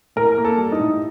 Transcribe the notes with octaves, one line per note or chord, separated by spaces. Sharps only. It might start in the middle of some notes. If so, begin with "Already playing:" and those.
A2 A#4
A#3
A4
G3
D#4
A2